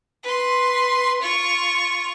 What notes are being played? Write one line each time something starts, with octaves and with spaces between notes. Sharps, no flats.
B4 C6
F4 C#6